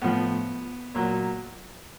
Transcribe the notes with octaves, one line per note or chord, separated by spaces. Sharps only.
A2 F3 B3
A#2 F#3